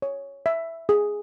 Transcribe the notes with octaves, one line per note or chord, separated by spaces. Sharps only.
C#5
E5
G#4